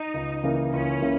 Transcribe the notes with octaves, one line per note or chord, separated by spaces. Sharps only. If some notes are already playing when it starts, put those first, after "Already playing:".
Already playing: D#4
C#2
C#3 E3 A#3
C#2 C#4
C#3 E3 A#3